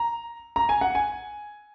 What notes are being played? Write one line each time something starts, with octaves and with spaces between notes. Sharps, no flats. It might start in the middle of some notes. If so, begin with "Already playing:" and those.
Already playing: A#5
A#5
G#5
F#5
G#5